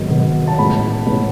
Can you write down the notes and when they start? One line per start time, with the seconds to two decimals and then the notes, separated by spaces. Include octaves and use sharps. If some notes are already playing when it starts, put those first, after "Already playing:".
Already playing: G#1 G#2 F#3 B3
0.10 G#1 G#2 F#3 B3
0.48 A5
0.58 A1 A2 G#3 B3 B5
1.06 A1 A2 G#3 B3